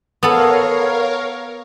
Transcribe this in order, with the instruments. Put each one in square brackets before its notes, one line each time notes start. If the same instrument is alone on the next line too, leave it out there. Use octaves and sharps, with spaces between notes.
[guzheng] B3 A4 [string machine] A#4 C#5 F5